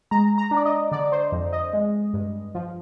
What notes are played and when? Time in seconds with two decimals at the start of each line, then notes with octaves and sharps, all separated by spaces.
0.11 G#3 A#5
0.38 A#5
0.51 D4
0.57 D5
0.65 D#5
0.92 D3 D5
1.12 C5
1.32 F2
1.53 D#5
1.73 G#3
2.14 G2
2.55 F3